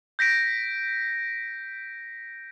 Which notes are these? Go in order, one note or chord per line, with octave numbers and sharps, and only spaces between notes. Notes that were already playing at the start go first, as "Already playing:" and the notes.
G6 A#6 B6 D7